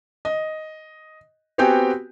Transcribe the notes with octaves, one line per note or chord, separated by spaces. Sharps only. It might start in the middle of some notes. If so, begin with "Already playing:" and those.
D#5
B3 C4 F#4 G4 G5 G#5